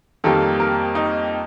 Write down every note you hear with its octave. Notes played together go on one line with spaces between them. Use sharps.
F2 D#3 G3 A#3 A4
A#4
D#4